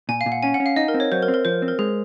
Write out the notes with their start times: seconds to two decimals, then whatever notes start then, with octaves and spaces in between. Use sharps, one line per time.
0.09 A#2 G#5
0.21 F5
0.26 A#2
0.32 F#5
0.43 C#4 G#5
0.54 F#5
0.60 C#4
0.66 F5
0.76 D#4 D#5
0.88 A#4
0.94 C4
1.00 C#5
1.12 F#3 C5
1.22 A#4
1.28 C4
1.34 A#4
1.45 F3 C5
1.62 C4
1.68 A#4
1.79 G#3 G#4